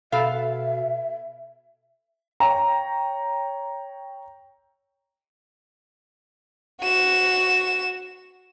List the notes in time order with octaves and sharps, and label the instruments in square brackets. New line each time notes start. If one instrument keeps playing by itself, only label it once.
[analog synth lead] B2 [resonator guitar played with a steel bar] B3 A4 F5 [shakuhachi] E5
[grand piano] C#5 G5 A#5
[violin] F#4 E7